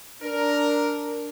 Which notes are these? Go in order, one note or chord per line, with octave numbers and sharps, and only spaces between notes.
D4 A#4